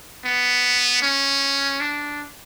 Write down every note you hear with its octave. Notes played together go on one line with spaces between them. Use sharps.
B3
C#4
D4